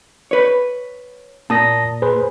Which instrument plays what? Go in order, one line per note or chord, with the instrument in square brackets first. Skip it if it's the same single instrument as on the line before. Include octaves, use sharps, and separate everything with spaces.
[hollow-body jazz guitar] B4 C#5
[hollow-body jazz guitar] A#2 [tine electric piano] A5 D#6 A#6
[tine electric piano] G#4 B4 C5